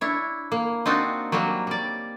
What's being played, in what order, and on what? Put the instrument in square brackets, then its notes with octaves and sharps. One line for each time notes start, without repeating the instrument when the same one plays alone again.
[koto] D4 E4 C#5
A#3
C4 D4 D#4 F4 F#4
F#3 G3 A#3 F#4
G3 D5